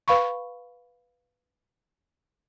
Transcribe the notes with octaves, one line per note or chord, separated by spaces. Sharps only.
B4 F5 B5 C#6